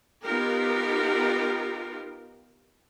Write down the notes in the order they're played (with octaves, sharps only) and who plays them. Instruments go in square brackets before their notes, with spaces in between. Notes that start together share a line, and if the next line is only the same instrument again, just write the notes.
[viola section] B3 D#4 F4 G4 A#4